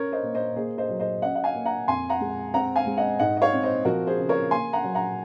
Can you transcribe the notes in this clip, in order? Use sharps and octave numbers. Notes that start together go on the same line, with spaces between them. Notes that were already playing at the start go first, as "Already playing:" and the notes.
Already playing: C#4 A#4 C#5
C5 D#5
A#3
C5 D#5
A#3 G#4 C5
C5 D#5
F#3
C5 D#5
C#4 D#5 F#5
F#5
F5 G#5
A#3
F#5 A#5
F2 G#5 C6
F#5 A#5
G#3
C4 F#5 A#5
F5 G#5
G#3
D#5 F#5
G#2 D#5 F#5
D#5
C#5 F5
C4
C5 D#5
F3 F#4 A#4
G#4 C5
C#3
A#4 C#5
A#3 G#5 C6
F#5 A#5
F#3
F#5 A#5